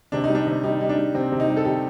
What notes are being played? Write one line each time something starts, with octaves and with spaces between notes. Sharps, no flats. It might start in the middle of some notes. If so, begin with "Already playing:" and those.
C3 D4
D#4
G3
D4
C3
G3 D#4
G3 D#4
D4
G3
C3 C4
C3
D#4
G3
A4
C3 G4